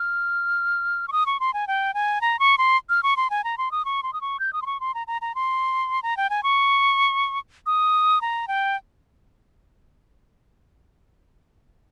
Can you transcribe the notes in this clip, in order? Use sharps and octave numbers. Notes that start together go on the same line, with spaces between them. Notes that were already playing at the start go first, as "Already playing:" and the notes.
Already playing: F6
C#6
D#6
C#6
C6
G#5
G5
G#5
A#5
C#6
C6
F6
C#6
C6
G#5
A#5
C6
D#6
C#6
C6
D#6
C#6
G6
D#6
C6
C#6
C6
A#5
A#5
A#5
C6
A#5
G5
G#5
C#6
D#6
A#5
G5